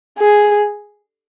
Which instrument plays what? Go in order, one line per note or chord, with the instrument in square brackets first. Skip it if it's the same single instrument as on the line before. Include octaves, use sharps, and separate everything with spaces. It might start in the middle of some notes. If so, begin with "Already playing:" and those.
[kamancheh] G#4